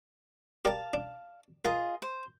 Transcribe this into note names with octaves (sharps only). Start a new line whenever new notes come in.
G4 A#4 D5 F5 A5
D4
F4 G#4 A#4 D#5
C5